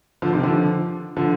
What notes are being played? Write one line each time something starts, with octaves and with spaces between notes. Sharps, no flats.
D3 F3
C3 D#3
D3 F3
D3 F3